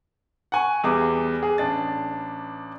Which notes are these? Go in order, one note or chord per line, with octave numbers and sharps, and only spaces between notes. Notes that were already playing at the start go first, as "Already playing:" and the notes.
F#5 G#5 C#6
E2 G3 G#4 D6
G#4
A1 D4 A6